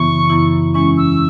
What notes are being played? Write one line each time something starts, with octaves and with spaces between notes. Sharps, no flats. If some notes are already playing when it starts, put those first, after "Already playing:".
Already playing: F#2 C#3 E3 B3 E4 C#6
F#2 C#3 E3 B3 E4
E2 E3 G#3 C#4 E4 C#6
E6